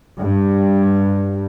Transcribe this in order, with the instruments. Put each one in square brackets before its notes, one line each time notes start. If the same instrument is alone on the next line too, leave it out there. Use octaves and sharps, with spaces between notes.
[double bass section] G2